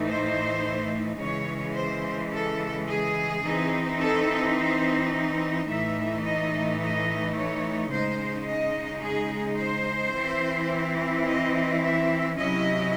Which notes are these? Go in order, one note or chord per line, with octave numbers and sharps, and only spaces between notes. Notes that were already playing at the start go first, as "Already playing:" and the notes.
Already playing: A2 E3 A3 D#4
C5
C#3 E3 G#3 C#5
C5
A4
G#4
E3 C4 D#4
A4
C5
A2 E3 A3 D#4 E5
D#5
D#5
C#5
C#3 G#3 D#4 C5
D#5
G#4
C5
E3 C4 E4
D#5
E5
C3 F#3 C#4 E4 D#5